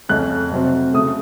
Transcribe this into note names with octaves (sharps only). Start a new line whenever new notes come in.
F2 C#3 A3 C#4 F#6
C3 F#3 C4
C#3 A3 D#6